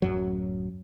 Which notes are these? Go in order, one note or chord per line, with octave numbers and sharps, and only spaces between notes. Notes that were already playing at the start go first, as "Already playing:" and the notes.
D1 F#2 F#3